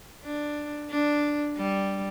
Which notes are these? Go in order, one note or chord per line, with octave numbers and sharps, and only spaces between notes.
D4
D4
G3